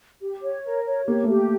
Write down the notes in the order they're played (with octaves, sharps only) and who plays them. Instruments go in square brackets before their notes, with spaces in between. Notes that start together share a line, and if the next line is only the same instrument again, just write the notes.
[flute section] G4
C#5
A#4
C#5
[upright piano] A#3 [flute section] G4
[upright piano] A3
[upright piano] A#3 [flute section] G4